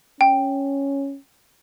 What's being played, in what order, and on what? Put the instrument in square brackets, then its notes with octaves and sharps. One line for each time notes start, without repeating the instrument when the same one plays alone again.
[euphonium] C#4 [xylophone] G5